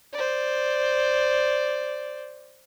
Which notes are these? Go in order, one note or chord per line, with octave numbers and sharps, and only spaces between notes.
C5 D5